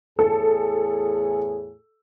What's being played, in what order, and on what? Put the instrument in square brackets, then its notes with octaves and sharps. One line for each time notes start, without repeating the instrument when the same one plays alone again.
[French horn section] E2 A2 G#4 [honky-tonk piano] A4